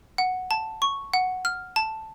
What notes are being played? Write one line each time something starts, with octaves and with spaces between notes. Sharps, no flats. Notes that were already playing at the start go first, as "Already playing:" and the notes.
F#5
A5
C#6
F#5
F6
A5